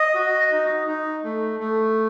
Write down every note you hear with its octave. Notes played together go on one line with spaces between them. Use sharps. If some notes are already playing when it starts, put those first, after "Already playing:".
Already playing: D#5
F#4
D#4
D#4
A3
A3